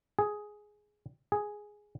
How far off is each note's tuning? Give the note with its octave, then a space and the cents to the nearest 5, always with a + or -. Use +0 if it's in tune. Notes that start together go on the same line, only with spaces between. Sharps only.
G#4 +5
G#4 +0